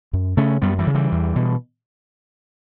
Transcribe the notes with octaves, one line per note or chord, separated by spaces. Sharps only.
F#2
C#3 A3 C#4
F#2 G3 B3
E3 G3
C#3
E3 G3
E2
B2